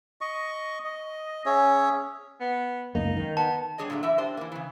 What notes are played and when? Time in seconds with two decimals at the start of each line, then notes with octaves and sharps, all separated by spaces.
0.21 D#5 C#6
0.84 D#5
1.46 C#4 G#4 C#5 E5
2.40 B3
2.95 C#2 F#2 A#3 D#4
3.17 D#3
3.37 B3 A5
3.78 G3 D4 G#4 C#5 D#5
3.90 A#2 D3 F#3 A3
4.03 E2 E3 E4 E5
4.18 D4 G4 C5
4.37 E3 A#3
4.52 C#3 E3